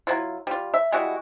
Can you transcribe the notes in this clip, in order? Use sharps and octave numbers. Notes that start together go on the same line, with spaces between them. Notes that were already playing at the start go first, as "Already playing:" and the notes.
F#3 G3 E4 F4
G3 F4
E5
G3 G#3 E4 F#4